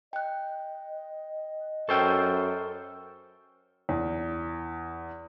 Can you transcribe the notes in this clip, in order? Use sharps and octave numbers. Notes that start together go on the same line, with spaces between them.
D#5 G5 F#6
F#2 A4 C5 G5 C#6 E6 F6
E2